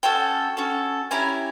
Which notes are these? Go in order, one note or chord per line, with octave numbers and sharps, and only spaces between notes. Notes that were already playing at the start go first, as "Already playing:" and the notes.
C#4 F#4 A4 G5 A5
C#4 F#4 A4
C#4 E4 G4 G#5 A#5